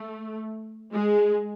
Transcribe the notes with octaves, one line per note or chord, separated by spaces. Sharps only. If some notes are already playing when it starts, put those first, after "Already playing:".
Already playing: A3
G#3